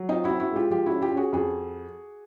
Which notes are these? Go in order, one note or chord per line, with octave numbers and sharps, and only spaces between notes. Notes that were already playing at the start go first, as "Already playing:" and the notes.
Already playing: F#3
C4 D#4 F4
E4 F#4
C4
E4 F#4
G#3
F4 G4
F3 F4 G4
C#4 E4 F#4
F4 G4
C#4
F#4 G#4
F2 F#4 G#4